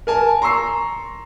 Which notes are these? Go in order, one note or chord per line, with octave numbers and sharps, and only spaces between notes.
A#4 G#5 A5
A#5 C6 C#6 E6 C7